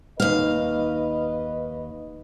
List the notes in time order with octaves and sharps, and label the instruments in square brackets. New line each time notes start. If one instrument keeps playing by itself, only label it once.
[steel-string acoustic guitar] D#2 F5 [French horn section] B4 D#5